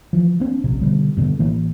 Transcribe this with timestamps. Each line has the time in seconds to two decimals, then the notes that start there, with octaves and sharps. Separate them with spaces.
0.13 E3 F3
0.40 A#3 C4 D4
0.64 D1 A#1 C3
0.81 B2 D3 G3
1.17 G2 B2 D3
1.39 A1 E3 A#3